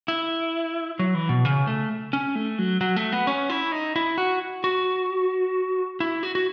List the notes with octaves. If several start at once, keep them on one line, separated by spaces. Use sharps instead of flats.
E4
F#3
E3
B2
C#3
A3
C#4
A3
F#3
F#3
A3
B3
C#4
E4
D#4
E4
F#4
F#4
E4
F#4
F#4